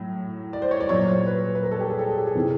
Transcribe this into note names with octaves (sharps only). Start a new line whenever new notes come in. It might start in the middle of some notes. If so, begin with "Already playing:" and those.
Already playing: A2 F#3
D5
C5
C#5
D5
A#2 F#3 C#5
C5
B4
B4
A#4
A4
G4
G#4
A4
G#4
G4
G#4
C3 E3